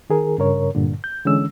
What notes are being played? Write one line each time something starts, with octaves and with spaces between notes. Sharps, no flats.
D#3 G#4 A#4
G2 C#3 A#4 C#5
G2 A#2 D3
G6
D3 E3 G#3 C#4 E6